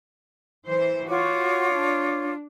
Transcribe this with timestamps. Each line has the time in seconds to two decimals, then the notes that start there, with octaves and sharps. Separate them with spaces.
0.67 E3 C5
1.08 F4 F#4 C#5 D6
1.74 D4